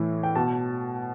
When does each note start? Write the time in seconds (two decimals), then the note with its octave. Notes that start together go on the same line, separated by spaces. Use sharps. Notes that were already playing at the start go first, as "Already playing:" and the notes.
Already playing: A2 E3
0.23 G5
0.35 B2 A5